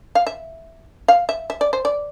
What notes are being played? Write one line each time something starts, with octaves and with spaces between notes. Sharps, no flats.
F5
E5
F5
E5
E5
D5
C5
D5